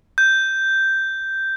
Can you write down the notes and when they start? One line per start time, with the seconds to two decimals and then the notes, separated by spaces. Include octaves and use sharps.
0.18 G6